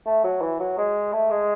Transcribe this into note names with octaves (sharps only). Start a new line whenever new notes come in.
A3
F#3
E3
F#3
G#3
A3
G#3